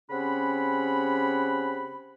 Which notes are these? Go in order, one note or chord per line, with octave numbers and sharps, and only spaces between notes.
C#3 C4 C#4 G4 F#5 B5